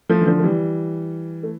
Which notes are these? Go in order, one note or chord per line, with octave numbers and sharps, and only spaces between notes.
F3 A3
E3
D3 F3
A3
E3 G3
A3